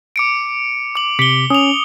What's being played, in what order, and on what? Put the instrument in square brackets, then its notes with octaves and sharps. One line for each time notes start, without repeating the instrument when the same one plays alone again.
[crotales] D6 C#7 D7
D6 F#7
[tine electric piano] C3 D6 B6 [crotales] C#7 G7
[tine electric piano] C#4 [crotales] D#6 F7